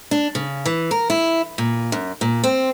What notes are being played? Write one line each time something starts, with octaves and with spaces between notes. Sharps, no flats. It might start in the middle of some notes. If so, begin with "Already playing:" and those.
D4
C#3
E3
A#4
E4
A#2
F#2
A#2
C4